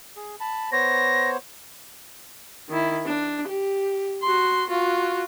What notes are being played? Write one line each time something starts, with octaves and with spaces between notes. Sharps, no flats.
G#4
A5 B5
B3 C5 C#5 A#6
D#3 E4
D4
G4
F#4 C6
F4 F#4